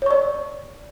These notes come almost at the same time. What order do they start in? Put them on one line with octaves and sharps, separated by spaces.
C#5 C#6 D5